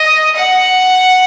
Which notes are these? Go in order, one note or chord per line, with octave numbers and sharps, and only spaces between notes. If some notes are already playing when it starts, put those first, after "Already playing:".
Already playing: D#5
F#5